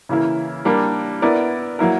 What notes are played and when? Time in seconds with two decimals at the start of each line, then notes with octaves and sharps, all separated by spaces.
0.09 C#3 E3 A#3 E4
0.65 G3 A#3 D4 A#4
1.22 B3 E4 A#4 D5
1.79 F#3 A#3 E4 A#4